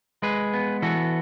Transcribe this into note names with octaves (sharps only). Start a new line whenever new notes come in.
G#3 G#4 B4
B3
E3 F#4 A4